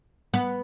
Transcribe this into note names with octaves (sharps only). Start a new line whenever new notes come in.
B3